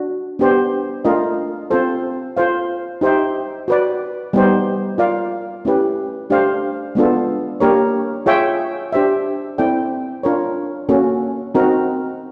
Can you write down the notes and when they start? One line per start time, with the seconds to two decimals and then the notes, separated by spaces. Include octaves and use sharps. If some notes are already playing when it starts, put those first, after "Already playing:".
Already playing: D4 F#4
0.39 B3 D4 G4 C5
1.05 A3 D4 F4 A#4 D#5
1.70 C4 F4 A4 C5
2.37 F4 A4 C5 F5
3.01 D#4 G4 C5 E5 G5
3.68 F#4 B4 D5
4.33 G3 B3 D#4 G4 C5
4.98 F4 A#4 D5 F5
5.65 A3 C#4 E4 G4 B4
6.30 A3 D4 G4 C5 F5
6.95 G#3 B3 D4 F4 A4
7.60 A#3 D4 G4 A#4 C#5
8.26 F4 G#4 C#5 E5 G5
8.93 D4 G4 C5 E5
9.58 C4 E4 A4 D5 G5
10.23 D4 F4 A#4 C#5
10.89 A#3 C#4 F#4 A4
11.55 C4 D#4 F#4 A#4